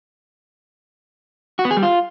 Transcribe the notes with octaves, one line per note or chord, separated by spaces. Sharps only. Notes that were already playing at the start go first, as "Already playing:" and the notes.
F#4
B3
G#4
G3
F4